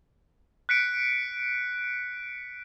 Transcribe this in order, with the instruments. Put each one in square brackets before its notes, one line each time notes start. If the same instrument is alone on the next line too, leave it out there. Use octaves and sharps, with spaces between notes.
[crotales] F#6 B6 C#7 D7